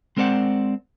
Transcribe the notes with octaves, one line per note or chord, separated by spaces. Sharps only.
G#3 C4 A#4 C5 D5 F#5